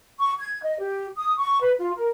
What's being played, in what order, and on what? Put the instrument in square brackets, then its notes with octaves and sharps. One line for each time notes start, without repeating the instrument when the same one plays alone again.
[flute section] C#6
G#6
D#5
G4
D#6
C#6
B4
F4
A#4